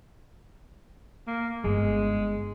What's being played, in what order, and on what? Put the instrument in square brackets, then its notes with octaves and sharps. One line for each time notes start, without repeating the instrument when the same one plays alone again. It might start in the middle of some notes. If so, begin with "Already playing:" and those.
[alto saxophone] A#3
[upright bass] G1 [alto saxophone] G#3